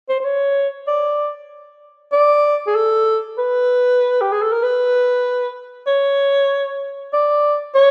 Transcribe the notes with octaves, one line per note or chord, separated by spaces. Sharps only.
C5
C5
C#5
D5
D5
G#4
A4
B4
G4
G#4
A4
A#4
B4
C#5
D5
C#5